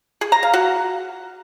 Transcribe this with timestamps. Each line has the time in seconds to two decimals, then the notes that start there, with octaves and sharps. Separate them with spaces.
0.21 G#4
0.32 A#5
0.43 F5
0.53 F#4